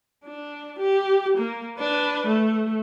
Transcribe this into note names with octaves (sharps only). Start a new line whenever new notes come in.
D4
G4
A#3
D4 B4
A3